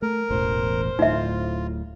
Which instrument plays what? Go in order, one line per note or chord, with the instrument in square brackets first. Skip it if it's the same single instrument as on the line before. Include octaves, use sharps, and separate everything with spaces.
[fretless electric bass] A3 [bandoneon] A#4
[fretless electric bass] E1 A1 E2 [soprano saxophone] C5
[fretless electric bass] D1 A2 [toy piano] D#4 E5 [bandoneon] F4